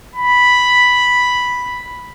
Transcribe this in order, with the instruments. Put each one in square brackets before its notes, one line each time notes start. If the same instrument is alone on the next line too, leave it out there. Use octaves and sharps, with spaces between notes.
[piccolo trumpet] B5